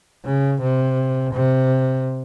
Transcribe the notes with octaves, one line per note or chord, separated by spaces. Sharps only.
C#3
C3
C3